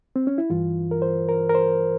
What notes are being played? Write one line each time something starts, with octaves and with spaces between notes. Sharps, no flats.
C4
C#4
E4
G2 E3 F4
A#4
C5
A#4
A#4
C5